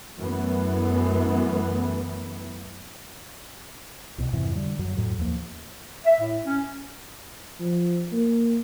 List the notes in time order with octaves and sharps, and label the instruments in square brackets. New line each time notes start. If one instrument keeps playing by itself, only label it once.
[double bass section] F#2 E3 A3 B3
[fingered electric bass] C2 B2
F2 G#2 C3 E3
D3 G3
F#2 F#3
F2 A2 F#3
D#2 F3 A#3
[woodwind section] E5
A2
C#4
[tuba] F3
A#3